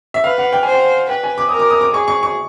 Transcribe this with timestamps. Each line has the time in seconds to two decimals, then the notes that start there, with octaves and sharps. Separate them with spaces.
0.14 E5
0.24 B4 F5
0.38 F#5
0.53 G5
0.63 C5 G#5
0.72 G5
1.09 B4 G5
1.24 G#5
1.38 D6
1.49 A#4 D#6
1.59 D6
1.70 D#6
1.81 D6
1.94 G#4 C#6
2.08 C#6
2.23 C#6